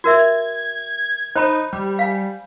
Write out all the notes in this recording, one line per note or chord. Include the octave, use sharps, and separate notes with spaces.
F#4 A#4 E5 G#6
D#4 C5 B5
G3
F5 G#5